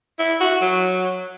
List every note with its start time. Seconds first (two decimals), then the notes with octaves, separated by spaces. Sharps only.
0.19 E4
0.40 F#4
0.62 F#3